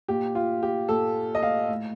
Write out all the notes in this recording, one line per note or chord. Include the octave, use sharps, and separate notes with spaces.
A#2 G4
F4
G4
A#2 A4
D#5
F5
A2